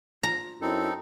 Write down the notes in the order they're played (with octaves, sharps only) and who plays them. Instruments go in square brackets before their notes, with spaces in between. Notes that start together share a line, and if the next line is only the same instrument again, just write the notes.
[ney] F4 [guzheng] A#5
[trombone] F#2 [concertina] C4 D#4 A4 [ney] E4